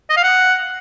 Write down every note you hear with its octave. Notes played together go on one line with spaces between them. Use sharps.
D#5
F5
F#5